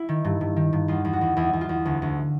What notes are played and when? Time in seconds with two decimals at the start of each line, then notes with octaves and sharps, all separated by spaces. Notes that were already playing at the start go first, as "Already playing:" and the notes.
Already playing: E4
0.09 D#3
0.25 G2
0.41 G2
0.56 D#3
0.73 G2
0.88 E2 F4
1.05 E2
1.13 F#4
1.21 E2
1.37 E2 E4
1.53 E2
1.61 F4
1.69 E2
1.85 D2
2.02 D2